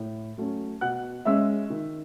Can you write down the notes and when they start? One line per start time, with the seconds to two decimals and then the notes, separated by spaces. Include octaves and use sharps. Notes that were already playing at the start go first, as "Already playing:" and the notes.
Already playing: A2
0.38 F#3 A3 C#4
0.81 B2 F#5 F#6
1.25 G#3 C#4 E5 E6
1.70 D#3